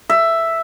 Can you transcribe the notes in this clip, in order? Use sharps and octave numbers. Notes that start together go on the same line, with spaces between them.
E5